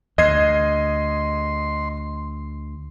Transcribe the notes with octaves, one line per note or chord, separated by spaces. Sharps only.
D2 D#5 C6 G#6 C7